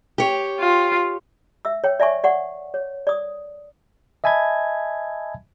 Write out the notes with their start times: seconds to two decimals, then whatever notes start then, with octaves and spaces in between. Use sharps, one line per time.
0.18 G4 C#5
0.60 F4
1.65 E5 E6
1.84 C#5 G5
2.00 D5 E5 G#5 C#6
2.24 D5 F#5 C#6
2.74 C#5
3.07 D5 D#6
4.24 D#5 E5 G#5 A5 B5 G#6